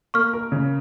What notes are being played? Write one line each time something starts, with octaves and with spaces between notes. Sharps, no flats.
A#3 C#6 F6
A#4
C#3